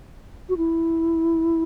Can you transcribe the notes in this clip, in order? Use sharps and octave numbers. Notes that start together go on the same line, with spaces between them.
F#4
E4